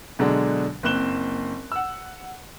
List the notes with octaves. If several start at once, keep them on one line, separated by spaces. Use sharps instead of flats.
B2 D3 F#3 G#3 D4
F#1 A#3 C4 F#6 E7 G7
F#5 E6